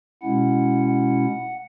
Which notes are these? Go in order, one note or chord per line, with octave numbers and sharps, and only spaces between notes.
B2 G#3 C#4 E4 F#5
F#5